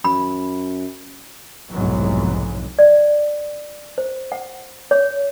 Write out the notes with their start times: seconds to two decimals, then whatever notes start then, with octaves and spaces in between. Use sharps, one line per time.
0.04 F#2 B5
1.70 F1 B1 G#2 E3 F#3
2.79 D5
3.98 C5
4.32 F#5
4.91 C#5